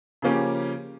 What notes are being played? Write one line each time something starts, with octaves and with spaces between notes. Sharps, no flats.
C#3 F3 A#3 C#4 G4